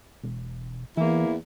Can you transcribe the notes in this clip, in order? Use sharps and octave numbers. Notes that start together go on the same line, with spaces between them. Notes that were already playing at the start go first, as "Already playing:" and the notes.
E1
E2 E3 A#3 E4